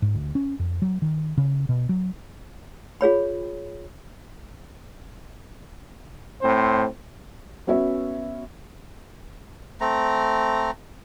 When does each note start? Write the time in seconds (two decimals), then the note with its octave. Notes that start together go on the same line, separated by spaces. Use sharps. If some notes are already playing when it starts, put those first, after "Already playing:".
0.02 G#2
0.15 D2
0.35 C#4
0.59 F2
0.82 F#3
1.02 D#3
1.37 C#3
1.69 B2
1.89 F#3
3.01 F4 G#4 C#5 B5
6.42 A2 C4 C5
7.67 B3 C#4 F#4 E5
9.81 A3 C4 A#5